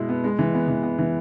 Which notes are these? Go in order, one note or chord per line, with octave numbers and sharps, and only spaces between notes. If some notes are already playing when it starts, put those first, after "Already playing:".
Already playing: B2 G#3 E4
B3
G#3
E3
B3
E3
B3
E3